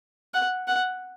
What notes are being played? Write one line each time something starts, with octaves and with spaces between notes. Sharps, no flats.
F#5
F#5